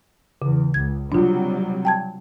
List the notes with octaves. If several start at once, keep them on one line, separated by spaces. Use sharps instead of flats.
E2 C#3
C#2 G#6
C3 F#3 G3 D4 F4
G5 A5 G#6